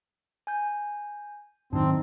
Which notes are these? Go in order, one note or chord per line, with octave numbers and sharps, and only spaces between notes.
G#5 G6
G#2 D#3 F#3 C4 D4 D#4